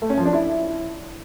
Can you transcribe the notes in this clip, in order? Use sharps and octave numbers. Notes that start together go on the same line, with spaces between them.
A3
C#4
F3
D4
E4